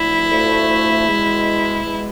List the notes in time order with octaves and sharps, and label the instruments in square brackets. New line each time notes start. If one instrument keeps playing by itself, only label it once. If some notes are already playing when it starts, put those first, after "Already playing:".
Already playing: [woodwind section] D2 D3 F3 A3 [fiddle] E4
[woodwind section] D2 D3 F3 A3
E2 B2 G#3
E2 B2 G#3